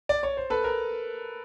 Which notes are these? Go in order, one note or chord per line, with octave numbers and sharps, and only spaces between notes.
D5
C#5
C5
A4 B4
A#4